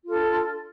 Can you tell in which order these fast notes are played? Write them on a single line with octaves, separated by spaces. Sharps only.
F4 A4 D4